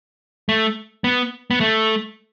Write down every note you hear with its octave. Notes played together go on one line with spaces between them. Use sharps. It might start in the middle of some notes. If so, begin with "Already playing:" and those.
A3
B3
B3
A3